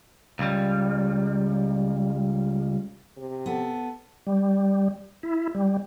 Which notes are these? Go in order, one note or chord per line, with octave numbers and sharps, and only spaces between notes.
C#2 G3
C3
B3 A4
G3
E4
G3